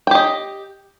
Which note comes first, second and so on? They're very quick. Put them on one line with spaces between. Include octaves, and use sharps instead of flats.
G5 G4 D#5